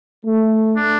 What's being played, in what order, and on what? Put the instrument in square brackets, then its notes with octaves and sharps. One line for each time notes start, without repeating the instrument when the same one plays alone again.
[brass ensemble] A3
[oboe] D4